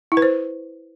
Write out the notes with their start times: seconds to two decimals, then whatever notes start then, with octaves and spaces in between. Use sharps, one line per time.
0.12 E4
0.17 B4
0.22 C5